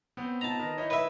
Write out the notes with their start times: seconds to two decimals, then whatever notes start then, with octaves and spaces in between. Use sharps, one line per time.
0.17 B3 C4 C#5 G5
0.41 D#4 F4 A5 A#5
0.59 D#3 A#4 B4
0.78 E4 C#5 D#5 G5 G#5
0.90 B4 E5